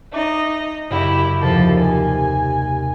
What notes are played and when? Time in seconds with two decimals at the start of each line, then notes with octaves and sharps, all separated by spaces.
0.12 D#4 D#5 E5 D6
0.90 F#1 F#2 E4 G4 F#5
1.41 D#2 C3 F3 A4
1.80 G#5